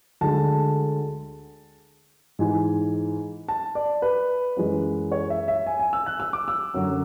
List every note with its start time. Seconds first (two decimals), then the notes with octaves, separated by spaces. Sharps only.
0.21 D2 D3 G#3 A5
2.39 G#2 E3 G#3 G#5
3.48 A5
3.75 D5
4.02 B4
4.57 F#2 E3 G#3
5.12 C#5
5.30 E5
5.48 E5
5.66 G#5
5.79 G#5
5.93 E6
6.06 F#6
6.20 E6
6.33 D6
6.48 E6
6.74 F#2 D3 F#3